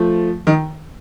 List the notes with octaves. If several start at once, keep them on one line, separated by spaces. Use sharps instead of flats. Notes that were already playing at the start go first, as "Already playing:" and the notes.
Already playing: F3 A3
D#3